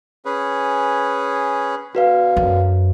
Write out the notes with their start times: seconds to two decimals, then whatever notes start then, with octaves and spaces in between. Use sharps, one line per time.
0.25 C#4 G#4 B4
1.95 B2 D3 F#4 B4 F5
2.37 F#2